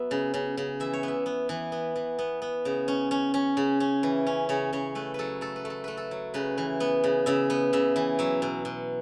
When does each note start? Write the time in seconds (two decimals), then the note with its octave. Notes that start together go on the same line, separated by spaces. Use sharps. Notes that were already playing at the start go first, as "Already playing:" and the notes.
Already playing: F#3 B3 B4 E5
0.11 C#3
0.34 C#3
0.57 C#3
0.80 E3 E5
0.93 C#5
1.03 B3 E5
1.26 B3
1.49 E3
1.72 B3
1.96 E3
2.19 B3
2.42 B3
2.65 C#3
2.88 C#4
3.11 C#4
3.34 C#4
3.57 C#3
3.80 C#4
4.03 E3
4.27 C#4
4.49 C#3 C#5
4.73 C#3 C#5
4.95 A3 B4
5.14 F#3 A4 B4
5.41 A3 A4
5.56 B4
5.65 A3
5.70 A4
5.84 A3 B4
5.97 A4
6.11 F#3
6.34 C#3 B4
6.58 E3
6.80 B3
7.04 C#3
7.26 C#3 E5
7.50 B3
7.73 C#3 E5
7.96 E3
8.19 F#3 E5
8.42 B2
8.65 B2